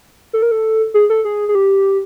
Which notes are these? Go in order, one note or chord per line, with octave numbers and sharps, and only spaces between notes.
A4
A#4
A4
G#4
A4
G#4
G#4
G4